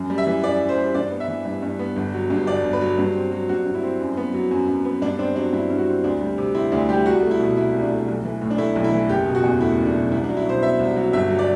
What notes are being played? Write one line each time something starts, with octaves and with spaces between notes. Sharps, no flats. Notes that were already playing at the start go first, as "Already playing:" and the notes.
Already playing: F#2
G3
E5
E3
F#2 D5
F#2
C5
G3
G2 D5
B3
E5
E3
G2
G2
B3
G1
F#3
G2
G1 D5
G1
B4
F#3
G2
C4
F#3
G2 F#4
G2
E4
C4
F#2
B3
F#3
F#2
F#2
B3
G2 D4
C4 D4
F#3 D4
G2 E4
G2
F#4
C4
D2 D4
G3
C3
C4 E4
D2 D4
G3 G4
C2 F#4
A3
E4
B2
C2 E4
C2
D4
A3
B1
E3
A2
D4
A3 E4
B1
E4
E3
F#1 G4
B2
F#4
E2
A3 E4
F#1
D4
B2
C2 E4
D4
F#3
E4
B2 C5
B3 E5
C2
F#3
G1 E5
F#3
D5